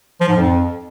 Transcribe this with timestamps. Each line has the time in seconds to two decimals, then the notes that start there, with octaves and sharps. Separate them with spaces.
0.21 F3
0.29 G#2
0.37 F2